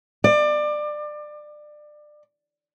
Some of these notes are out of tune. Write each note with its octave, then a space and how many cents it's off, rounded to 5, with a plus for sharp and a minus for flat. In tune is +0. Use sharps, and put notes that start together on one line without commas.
D5 +25